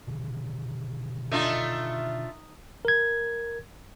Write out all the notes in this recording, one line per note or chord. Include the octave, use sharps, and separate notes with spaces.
B2 D3 D#3
A3 D4 D#4 F4 G#5
A#4 G#6